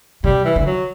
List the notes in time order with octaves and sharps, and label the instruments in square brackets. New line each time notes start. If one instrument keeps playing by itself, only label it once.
[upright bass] C3 [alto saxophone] G3
[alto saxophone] E3
[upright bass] D3 [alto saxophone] E3
[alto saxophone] F#3